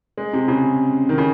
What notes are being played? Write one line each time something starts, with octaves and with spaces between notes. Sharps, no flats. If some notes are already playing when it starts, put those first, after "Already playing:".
G#3
C3
C#3
D#3
C#3